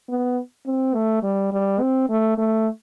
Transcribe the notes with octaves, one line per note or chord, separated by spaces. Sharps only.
B3
C4
A3
G3
G3
C4
A3
A3